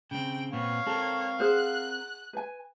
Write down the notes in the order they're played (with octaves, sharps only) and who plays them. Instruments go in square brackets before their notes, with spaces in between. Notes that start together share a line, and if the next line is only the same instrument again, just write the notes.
[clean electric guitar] C#3 C4 [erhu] G5
[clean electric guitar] A#2 B3 C4 [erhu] C#5 [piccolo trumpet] F5
[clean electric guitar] C4 A#4 [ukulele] A4
[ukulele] G#4 C5 F#5 [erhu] F#6
[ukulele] B4 G#5